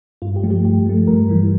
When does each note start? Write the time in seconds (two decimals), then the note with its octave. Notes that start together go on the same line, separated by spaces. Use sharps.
0.22 G2 F4
0.36 G4
0.43 F3 A3
0.50 G4
0.65 G2 G4
0.86 F3 A3
1.07 G2 A#4
1.29 E3 G3